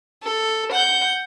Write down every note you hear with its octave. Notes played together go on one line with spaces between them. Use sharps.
A4
F#5 G6